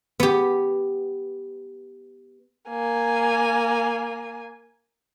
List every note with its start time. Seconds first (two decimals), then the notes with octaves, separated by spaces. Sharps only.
0.20 B3 G4
2.69 A#3 G#5